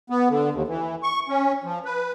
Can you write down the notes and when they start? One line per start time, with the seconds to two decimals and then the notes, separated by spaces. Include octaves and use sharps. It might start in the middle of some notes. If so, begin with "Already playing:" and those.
0.10 B3
0.29 D3
0.53 D#2
0.68 E3
1.03 C#6
1.29 C#4
1.64 F3
1.85 B4